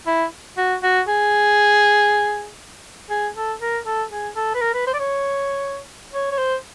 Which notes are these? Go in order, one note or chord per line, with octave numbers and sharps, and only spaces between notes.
E4
F#4
F#4
G#4
G#4
A4
A#4
A4
G#4
A4
B4
A#4
B4
C5
D5
C#5
C#5
C#5
C5